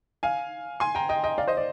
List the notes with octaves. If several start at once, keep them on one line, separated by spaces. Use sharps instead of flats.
F5 G#5
G#5 C6
G5 A#5
D#5 G5
D#5 G5
D5 F5
C5 D#5
D5